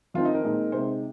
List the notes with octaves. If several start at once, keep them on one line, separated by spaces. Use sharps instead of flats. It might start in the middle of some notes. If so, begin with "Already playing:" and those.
F2 D#3 C4 D#4 F4
D#4
A#4
A#2 G#3 C4 D#4
C3 G#3 D#4 C5